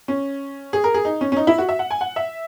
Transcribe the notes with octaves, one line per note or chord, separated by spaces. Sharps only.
C#4
G#4
A#4
G#4
D#4
C#4
C#4
D#4
E4
F#4
E5
F#5
G#5
F#5
E5